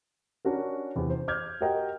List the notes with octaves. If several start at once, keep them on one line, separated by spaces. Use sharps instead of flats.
C#4 D4 F#4 A#4
E2 C3
C5
D6 F6 G6 G#6
F#4 G4 A#4 D#5 F#5 G5